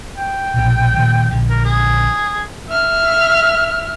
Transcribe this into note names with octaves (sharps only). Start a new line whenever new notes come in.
G5
A#1 B2
A#2 D#3 F3
A#1 D3
A#4
G#4
E5 F6